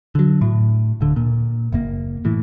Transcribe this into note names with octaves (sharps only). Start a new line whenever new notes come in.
D3 F#3
A2
D1 D3
A#2
F#1 F#2 A#3
A2 E3